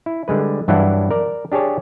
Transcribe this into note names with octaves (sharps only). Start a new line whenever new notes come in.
E4
D3 G3 G#3 B4
G2 E3 F#3 D4 E4 F#5
A#4 D5
D4 G4 G#4 C#5 A5